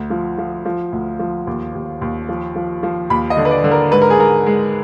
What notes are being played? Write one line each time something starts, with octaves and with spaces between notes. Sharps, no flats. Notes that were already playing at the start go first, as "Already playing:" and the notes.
Already playing: D2
F3
F3
F3
D2
F3
D#2
D#2
D#2
F3
F3
F3
D#2 B5
D#5
D3
B4
D5
D3
A#4
G#2 B4
A#4
G#4
G#2 A#4
G#3